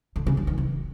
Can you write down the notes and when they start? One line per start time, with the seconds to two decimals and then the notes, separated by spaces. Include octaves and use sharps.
0.16 D3
0.27 C#3
0.37 D3
0.47 D#3
0.58 E3